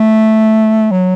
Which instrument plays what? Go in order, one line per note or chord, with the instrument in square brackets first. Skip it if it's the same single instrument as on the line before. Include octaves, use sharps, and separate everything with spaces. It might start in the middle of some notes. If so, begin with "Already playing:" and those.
Already playing: [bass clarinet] A3
F#3